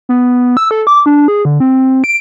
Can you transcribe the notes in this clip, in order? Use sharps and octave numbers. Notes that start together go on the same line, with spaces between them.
B3
E6
A4
D6
D4
G#4
D3
C4
D7